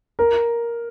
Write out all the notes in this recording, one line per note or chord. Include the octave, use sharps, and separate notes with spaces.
A#4